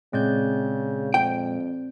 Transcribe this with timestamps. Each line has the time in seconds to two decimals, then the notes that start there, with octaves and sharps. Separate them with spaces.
0.13 A#2 C#3 G#3 C4 D5 G6
1.14 F2 G5